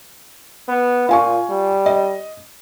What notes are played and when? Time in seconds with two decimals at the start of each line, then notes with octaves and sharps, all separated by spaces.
0.68 B3
1.09 A#2 F4 G#5 C#6
1.49 G3
1.86 D#5